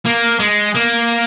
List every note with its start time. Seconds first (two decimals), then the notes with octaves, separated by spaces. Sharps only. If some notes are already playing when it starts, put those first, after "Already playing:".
0.05 A#3
0.40 G#3
0.75 A#3